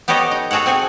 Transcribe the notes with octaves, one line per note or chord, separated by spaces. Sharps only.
B3 G4 A4 C#5 D#5
D#4
F#4 G#4 A4 C#5 F#5
C4 G#4 F#5 G#5